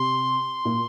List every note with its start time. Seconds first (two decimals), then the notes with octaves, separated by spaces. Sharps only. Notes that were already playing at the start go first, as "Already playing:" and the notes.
Already playing: C3 C6
0.65 A#2